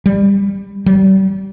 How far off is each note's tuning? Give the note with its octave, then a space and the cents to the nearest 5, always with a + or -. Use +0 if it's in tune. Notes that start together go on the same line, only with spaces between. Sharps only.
G3 +20
G3 -35